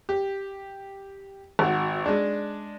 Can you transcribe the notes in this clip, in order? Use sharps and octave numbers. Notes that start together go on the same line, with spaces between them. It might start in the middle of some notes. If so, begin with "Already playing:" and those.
G4
G#1 F#4
G#3 D4